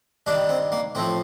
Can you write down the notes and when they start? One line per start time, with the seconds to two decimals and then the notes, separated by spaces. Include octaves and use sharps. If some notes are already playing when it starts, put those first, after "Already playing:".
0.26 G2 D#3 G3 D4
0.49 C4
0.72 A#3
0.95 A2 F3 C4